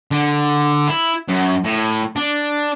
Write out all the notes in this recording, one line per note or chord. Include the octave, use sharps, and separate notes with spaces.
D3
E4
F#2
A2
D4